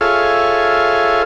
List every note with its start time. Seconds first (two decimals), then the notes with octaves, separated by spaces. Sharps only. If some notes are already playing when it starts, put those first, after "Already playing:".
0.01 F4 G#4 A4 C#5 E5 F5